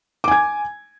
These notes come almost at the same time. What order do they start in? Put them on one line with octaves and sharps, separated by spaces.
D6 G#5 G#6